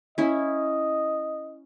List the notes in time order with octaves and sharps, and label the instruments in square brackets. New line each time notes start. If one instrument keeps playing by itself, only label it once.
[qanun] C#4 E4 [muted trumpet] D#5